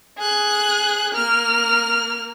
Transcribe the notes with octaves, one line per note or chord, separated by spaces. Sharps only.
G#4 F#6
A#3 F6